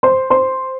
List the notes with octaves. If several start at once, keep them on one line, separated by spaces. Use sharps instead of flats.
C5 C6
C5 C6